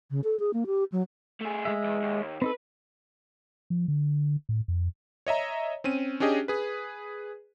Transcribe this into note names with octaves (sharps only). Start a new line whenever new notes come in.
C#3
A4
G#4
A#3
G4
F#3
A3 G#4
G#3 E5
E2
D#2
C4 D#4 A4 B4
F3
D3
A2
F2
C#5 D#5 E5 A#5
C4 C#4 D#7
C#4 D4 G4 G#4 D#5
G#4 B4